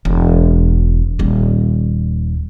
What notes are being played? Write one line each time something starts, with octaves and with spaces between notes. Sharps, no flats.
E1
D#1 G3